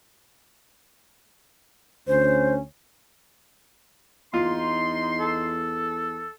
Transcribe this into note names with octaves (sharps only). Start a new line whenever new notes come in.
D2 C#4 C5
E2 D#4 F4 C6
A4